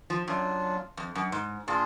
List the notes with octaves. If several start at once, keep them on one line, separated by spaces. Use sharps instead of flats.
F3
F#2 F#3 D4 F4
F2
F#2
G#2
A#2 D4 F4 G#4